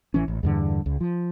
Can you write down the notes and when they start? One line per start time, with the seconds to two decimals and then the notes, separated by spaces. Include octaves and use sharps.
0.14 A1 E3 C#4
0.28 A1
0.43 E2 G2 D3
0.86 C#2
1.01 F3